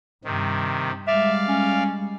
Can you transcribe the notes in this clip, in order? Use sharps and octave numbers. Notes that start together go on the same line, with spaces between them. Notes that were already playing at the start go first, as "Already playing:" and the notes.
G2 C3 D#3
G3 G#3 D5 E5 F5
C#4